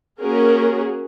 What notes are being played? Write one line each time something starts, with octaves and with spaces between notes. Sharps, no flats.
A#3 C#4 F#4 G#4 A#4